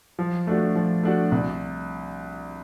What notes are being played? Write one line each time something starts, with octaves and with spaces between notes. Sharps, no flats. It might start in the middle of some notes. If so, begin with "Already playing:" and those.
F3
A3 D4 F#4
F3
A3 D4 F#4
C2